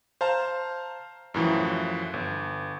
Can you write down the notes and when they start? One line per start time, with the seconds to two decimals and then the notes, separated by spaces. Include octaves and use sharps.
0.21 C5 F5 A5 A#5
1.34 F#2 A2 E3 F3
2.14 G1